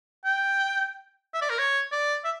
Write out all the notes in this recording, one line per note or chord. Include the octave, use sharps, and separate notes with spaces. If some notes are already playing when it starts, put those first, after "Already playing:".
G5
E5
D5
A#4
C#5
D5
E5